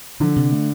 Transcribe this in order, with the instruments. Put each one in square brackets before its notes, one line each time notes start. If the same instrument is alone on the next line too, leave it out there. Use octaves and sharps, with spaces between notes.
[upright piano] D3 [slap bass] F3
[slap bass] C3
A3